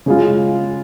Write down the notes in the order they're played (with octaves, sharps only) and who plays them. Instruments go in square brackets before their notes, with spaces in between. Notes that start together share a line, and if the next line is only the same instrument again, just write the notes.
[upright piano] C#3 G#3 F4